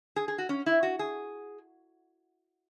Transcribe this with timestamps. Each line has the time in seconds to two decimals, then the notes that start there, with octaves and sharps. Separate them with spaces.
0.16 G#4
0.28 G#4
0.38 F#4
0.49 C#4
0.66 E4
0.83 F#4
0.99 G#4